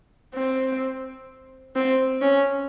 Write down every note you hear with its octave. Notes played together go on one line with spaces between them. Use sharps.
C4
C4
C#4